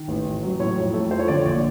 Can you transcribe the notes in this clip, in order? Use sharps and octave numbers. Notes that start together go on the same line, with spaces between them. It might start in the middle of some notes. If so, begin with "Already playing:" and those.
Already playing: D#3
A1
A1
F#3
A2 C#5
F2
A3
F3 C5
C#5
D3 D5
C#5
A#1 D5